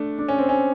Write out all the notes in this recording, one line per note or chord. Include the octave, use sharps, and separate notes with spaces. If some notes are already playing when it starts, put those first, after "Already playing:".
Already playing: A3 D4
D4
C#4
C4
C#4